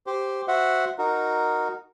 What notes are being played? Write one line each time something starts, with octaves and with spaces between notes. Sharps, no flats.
G4 C5
F#4 C5 E5 F#5
D#4 F#4 A#4